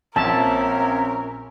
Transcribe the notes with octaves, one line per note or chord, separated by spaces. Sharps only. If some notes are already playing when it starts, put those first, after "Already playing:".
A#1 C4 C#4 A#4 E5 A5